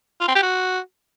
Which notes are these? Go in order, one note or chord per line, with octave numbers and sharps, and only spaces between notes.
F4
C4
G4
F#4